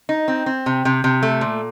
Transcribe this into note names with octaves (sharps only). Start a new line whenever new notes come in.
D#4
C4
C4
C3
C3
C3
A3
A#2